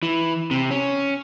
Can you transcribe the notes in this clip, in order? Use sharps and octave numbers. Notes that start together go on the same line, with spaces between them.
E3
C3
C#4